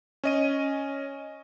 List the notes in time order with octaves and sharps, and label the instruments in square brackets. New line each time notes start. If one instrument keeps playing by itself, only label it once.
[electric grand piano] C#4 D#5 D#7